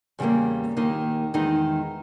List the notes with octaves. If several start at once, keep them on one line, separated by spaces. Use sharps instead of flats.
E2 C#3 E3 G3 A#3
D#2 D#3 A#3 D#4
E2 D#3 G#3 D#4